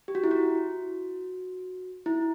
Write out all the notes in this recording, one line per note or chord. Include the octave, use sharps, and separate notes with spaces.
G4
F#4
E4
F#4
E4